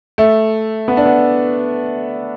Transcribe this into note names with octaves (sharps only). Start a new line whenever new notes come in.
A3
B3
D4
B3